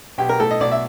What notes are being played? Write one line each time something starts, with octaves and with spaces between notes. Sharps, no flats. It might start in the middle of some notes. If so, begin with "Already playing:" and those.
B1 G4
A#4
A2 A4
D#5
B1 D5
E5